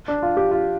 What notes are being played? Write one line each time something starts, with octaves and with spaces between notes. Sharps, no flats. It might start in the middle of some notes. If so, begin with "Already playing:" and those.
D4
F4
G4
F4